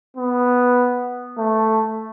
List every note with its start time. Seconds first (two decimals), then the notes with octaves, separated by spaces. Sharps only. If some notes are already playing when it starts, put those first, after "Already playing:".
0.17 B3
1.38 A3